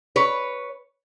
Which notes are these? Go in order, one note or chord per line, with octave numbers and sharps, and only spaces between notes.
B4 C#5